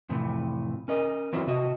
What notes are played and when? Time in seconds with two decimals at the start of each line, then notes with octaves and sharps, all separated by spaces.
0.09 F2 A2 C3 E3
0.88 C#4 A#4 D#5
1.33 E3 F#3 C4 E4 F4 C5
1.47 C3 F#4 D#5